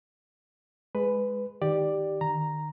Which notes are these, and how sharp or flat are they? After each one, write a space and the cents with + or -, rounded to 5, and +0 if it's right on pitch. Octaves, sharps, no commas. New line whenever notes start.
G#3 +0 B4 +10
D#3 +0 G4 +0 D5 +5
D#3 -35 A#5 +0